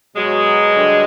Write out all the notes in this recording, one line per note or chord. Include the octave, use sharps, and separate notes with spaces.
B2 F#3 G#3
G2 D3 F#3